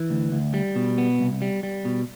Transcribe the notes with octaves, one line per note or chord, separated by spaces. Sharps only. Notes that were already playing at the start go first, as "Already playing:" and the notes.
Already playing: E3
D2
D2
G3
B2
B3
C2
G3
G3
B2